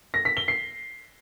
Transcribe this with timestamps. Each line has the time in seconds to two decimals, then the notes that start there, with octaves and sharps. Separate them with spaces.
0.14 A#6
0.25 B6
0.37 G7
0.48 C7